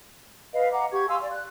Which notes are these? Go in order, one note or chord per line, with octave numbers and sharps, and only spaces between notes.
B4 D#5 F5
D#5 F#5 A#5 D6
G4 C#6 G#6
F5 G#5 C6 E6
D5
F#6